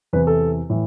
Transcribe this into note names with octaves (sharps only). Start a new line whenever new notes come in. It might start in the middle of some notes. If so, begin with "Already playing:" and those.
E2 C3 E3 B4
A4
A2 E3